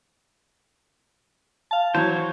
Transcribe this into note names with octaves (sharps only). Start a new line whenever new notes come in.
F5 A5
E3 F#3 C5 C#5